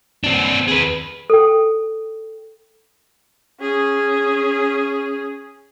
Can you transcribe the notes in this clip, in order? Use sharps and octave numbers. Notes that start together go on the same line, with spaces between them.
C4 D4
G#4 B4
A4 G5
C#4 G#4